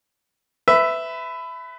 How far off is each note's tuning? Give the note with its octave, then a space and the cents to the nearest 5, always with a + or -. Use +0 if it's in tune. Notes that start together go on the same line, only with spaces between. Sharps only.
B4 +25 E5 +0